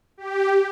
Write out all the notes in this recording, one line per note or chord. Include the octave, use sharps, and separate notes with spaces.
G4